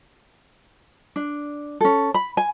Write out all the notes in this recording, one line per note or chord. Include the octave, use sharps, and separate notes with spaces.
D4
C#4 A4
B5
G#5